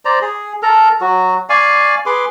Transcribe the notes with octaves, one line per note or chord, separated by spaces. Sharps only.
C5 D5 A#5
G#4
A4 A#4 A#5
F#3 F#4
D5 F5 G#5 C#6
G#4 B4 C6 D6